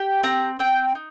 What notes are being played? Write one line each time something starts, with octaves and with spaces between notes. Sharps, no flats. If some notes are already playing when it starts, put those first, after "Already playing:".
Already playing: G4
C4 A#5
C4 G5
D#4